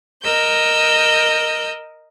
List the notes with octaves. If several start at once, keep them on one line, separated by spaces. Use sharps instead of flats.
A#4 D#5 E6 G6